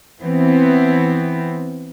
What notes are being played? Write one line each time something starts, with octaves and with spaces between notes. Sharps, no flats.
E3 B3 C4